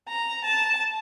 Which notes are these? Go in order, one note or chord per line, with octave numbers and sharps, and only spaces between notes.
A#5
A5